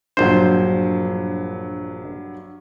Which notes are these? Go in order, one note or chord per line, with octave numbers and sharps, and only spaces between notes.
A#1 G2 F#3 C5